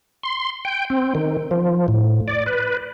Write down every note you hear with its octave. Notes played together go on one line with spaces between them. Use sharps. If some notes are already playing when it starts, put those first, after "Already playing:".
C6
G5
C4
D#3
F3
A2
D5
B4